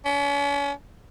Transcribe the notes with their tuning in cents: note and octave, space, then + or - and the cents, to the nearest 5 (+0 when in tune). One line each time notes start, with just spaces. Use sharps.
C#4 +40